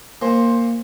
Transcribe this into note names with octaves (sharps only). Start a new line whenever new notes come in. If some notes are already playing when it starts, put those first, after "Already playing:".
A#2 C5